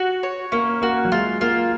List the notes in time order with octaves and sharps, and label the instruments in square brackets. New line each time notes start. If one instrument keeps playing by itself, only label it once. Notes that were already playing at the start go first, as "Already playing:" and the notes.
Already playing: [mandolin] F#4
C#5
[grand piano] A#3 [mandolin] C#4
[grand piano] A#3 [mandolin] F#4
[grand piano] F#3
[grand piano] G#3 [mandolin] F4
[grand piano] A#3 [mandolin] F4